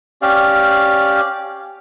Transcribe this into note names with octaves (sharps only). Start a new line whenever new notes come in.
C#4 G4 D5 F5